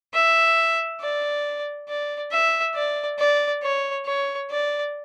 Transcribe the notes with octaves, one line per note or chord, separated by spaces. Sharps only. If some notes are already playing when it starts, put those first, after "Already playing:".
E5
D5
D5
E5
D5
D5
C#5
C#5
D5